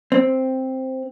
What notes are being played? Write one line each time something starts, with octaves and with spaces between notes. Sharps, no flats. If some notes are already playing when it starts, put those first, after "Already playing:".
C4